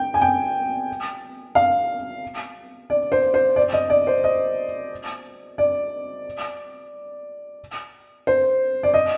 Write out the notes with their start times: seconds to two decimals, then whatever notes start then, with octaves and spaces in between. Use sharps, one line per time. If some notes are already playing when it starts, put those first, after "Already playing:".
Already playing: G5
0.14 G#5
0.21 G5
1.55 F5
2.90 D5
3.12 C5
3.34 C5
3.56 D5
3.73 D#5
3.90 D5
4.07 C5
4.24 D#5
5.58 D5
8.27 C5
8.83 D5
8.94 D#5